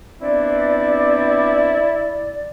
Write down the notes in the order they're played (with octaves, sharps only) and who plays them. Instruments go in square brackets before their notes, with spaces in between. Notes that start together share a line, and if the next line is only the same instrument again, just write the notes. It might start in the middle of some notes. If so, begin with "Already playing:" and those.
[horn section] B3 C4 D4 [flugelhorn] E4 [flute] D5